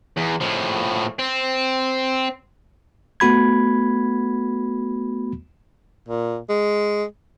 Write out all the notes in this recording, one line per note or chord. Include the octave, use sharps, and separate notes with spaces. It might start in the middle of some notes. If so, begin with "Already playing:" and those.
E2
A2 F3
C4
A3 B3 F#4 B5 G#6
A#2
G#3